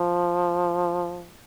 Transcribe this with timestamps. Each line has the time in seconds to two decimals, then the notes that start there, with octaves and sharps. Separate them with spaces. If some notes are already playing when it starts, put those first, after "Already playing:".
Already playing: F3